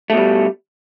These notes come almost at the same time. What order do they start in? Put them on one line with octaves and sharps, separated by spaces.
A3 B2 G3